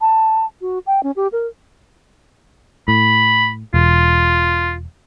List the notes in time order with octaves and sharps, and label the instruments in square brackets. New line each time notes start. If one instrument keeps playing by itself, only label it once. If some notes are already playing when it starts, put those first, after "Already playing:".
[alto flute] A5
F#4
G5
C#4
G4
A#4
[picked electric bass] A2 [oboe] B5
[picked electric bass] E1 [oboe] F4